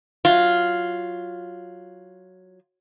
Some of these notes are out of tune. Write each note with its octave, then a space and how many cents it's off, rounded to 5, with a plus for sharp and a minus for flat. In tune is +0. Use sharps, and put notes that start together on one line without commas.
F#3 +0 F4 +0